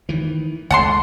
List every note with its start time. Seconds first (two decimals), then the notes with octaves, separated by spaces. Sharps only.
0.09 D#3 E3
0.71 C#2 A3 F#5 A5 C6